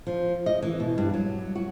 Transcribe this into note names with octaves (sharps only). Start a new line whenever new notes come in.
F3
D#5
E3
B2
G2
F#3
F#4